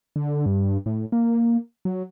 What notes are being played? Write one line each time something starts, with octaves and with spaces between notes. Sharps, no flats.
D3
G2
A2
A#3
F#3